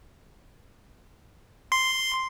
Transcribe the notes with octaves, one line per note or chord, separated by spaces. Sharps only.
C6